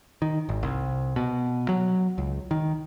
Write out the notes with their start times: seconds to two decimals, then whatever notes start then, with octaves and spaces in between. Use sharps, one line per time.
0.22 D#3
0.49 G#1
0.63 C2
1.16 B2
1.69 F#3
2.18 C#2
2.51 D#3